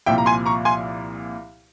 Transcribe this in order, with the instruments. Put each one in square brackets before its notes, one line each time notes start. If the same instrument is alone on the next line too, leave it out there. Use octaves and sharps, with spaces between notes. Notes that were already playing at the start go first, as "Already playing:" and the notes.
[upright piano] C2 A#2 F3 E5 G5
A#5
G#5 C6
A#5 C#6
G#5 C6